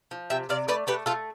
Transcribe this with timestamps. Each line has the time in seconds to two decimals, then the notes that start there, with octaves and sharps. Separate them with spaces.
0.11 F3
0.30 C3 E5 G5
0.49 C3 D5 F5
0.68 A3 B4 D5
0.87 A3 G4 B4
1.06 A3 F4 A4